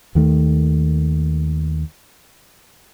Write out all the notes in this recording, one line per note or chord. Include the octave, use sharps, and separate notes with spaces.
D#2 D#3 A3